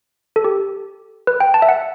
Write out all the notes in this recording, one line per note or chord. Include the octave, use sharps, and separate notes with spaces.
A4
G4
B4
G5
A5
E5
F#5